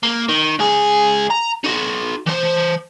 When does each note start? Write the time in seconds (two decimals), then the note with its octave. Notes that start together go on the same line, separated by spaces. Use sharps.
0.03 A#3
0.29 D#3
0.59 C#2 G#4
1.30 A#5
1.64 D#4 F#4
2.26 E3 C5